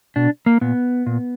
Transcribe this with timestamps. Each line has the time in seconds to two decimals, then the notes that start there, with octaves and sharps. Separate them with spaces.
0.16 B2 D4
0.46 A#3
0.61 A#2 B3
1.06 A#2